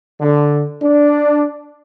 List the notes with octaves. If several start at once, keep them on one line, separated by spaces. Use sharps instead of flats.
D3
D4